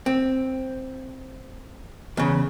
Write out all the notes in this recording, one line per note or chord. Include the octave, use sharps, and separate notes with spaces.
C4
E2 C#3